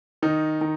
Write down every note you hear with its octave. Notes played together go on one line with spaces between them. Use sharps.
D#3 D#4
D#3